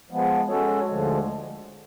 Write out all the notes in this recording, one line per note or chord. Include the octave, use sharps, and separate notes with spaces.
F3 G#3 B3
G#3 C#4 F#4 A4 C#5
D2 D3 F3 G#3